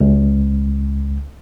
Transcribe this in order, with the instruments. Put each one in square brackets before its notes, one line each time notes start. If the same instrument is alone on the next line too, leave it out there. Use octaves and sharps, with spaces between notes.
[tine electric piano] C#2